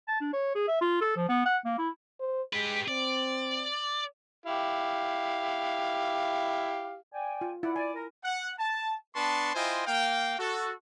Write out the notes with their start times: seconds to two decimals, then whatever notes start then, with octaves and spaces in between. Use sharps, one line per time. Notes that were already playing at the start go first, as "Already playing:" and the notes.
0.08 A5
0.21 D4
0.33 C#5
0.55 G#4
0.68 E5
0.81 F4
1.01 A4
1.16 F3
1.29 B3
1.45 F#5
1.65 A#3
1.78 E4
2.20 C5
2.53 G#3 G4 B4
2.88 C4 D5
4.46 E4 G4 F5
7.13 D5 G5 G#5
7.41 F4
7.63 E4 D5 F#5
7.76 D5 G#5
7.95 A#4
8.24 F#5
8.59 A5
9.15 B3 D4 B4 A5 C6 C#6
9.55 E4 F4 C5 D#5 G5 G#5
9.87 A#3 F5 G5
10.39 F#4 A4